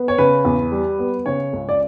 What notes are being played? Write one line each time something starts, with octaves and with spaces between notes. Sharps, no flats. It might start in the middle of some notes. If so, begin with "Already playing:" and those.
Already playing: B3
C#5
C#3 B4
E2
G3
B3
C#3 C#5
C#2
D5